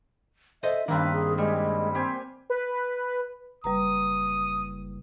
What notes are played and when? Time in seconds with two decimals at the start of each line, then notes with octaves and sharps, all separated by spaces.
0.63 A4 C5 D#5 E5
0.88 G2 D#3 A#3 C4 D4 B4
1.13 G#4
1.38 G3 G#3 G4
1.95 C4 G4 C5 G#5
2.50 B4
3.64 F#1 G3 B4 A#5 D#6